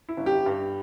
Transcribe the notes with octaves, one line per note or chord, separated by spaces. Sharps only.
E4
G1
G4
G2